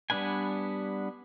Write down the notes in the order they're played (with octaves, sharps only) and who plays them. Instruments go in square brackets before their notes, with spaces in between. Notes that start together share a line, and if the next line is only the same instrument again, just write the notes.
[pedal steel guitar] G3 B3 D4 B4 G#5